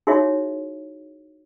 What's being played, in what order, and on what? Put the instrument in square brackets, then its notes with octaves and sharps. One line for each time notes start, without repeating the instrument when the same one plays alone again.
[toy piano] D#4 E4 F#4 G#4 C#5 E5